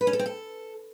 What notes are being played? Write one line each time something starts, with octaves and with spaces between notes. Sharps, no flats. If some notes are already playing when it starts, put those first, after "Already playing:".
B4
C#4
A4
C4
A4